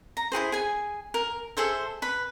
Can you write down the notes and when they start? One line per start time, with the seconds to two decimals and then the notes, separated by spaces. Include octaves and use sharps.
0.17 A#5
0.32 E4 F#4 G#4 C5
0.52 G#4 G#5
1.14 A#4
1.57 G#4 A4 C5 E5
2.02 B4 B5